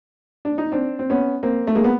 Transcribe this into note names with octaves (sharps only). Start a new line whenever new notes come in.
D4
D#4
C4 D4
C4
B3 C#4
A#3 C4
A3
G#3 A#3
B3